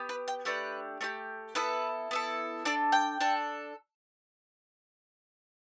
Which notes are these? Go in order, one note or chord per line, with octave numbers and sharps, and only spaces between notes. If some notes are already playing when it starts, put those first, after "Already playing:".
Already playing: B3 G4
B4
G5
A3 D4 G4 B4
A3 D4 G4
B3 E4 A4 B4
B3 E4 A4
D4 A4 D5
G5
D4 A4